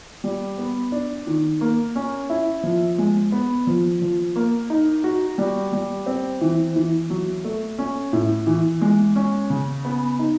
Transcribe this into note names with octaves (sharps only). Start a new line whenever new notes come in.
G3
B3
D4
D#3
A#3
C#4
E4
F3
G#3
B3
F3
F3
A#3
D#4
F#4
G3
G3
C4
E3
E3
F#3
A3
C#4
A2
E3
G#3
C#4
C#3
B3
D#4